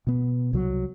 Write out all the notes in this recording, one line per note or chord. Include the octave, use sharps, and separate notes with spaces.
B2 B3
C2 F#3